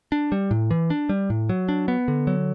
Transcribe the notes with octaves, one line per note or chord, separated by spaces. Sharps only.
D4
G3
A2
E3
D4
G3
A2
F#3
D4
B3
D3
F#3